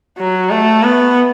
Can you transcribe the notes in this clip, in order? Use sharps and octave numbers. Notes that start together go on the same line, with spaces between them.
F#3
A3
B3